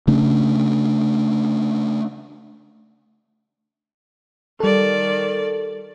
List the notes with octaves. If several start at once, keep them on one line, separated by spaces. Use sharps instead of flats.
C#3 A3 C#4 D4
D#3 G3 A4 D5